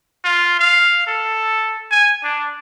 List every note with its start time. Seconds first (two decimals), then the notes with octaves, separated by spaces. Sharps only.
0.24 F4
0.59 F5
1.07 A4
1.91 G#5
2.23 D4